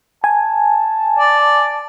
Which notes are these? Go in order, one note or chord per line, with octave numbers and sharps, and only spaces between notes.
G#5 A5
D5